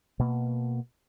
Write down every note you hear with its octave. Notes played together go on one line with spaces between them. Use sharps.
B2 A#3